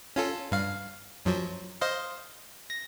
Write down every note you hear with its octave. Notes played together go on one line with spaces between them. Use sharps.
C#4 F4 A4
G2 F5
F#2 F3 F#3
C5 D#5 F5
A#6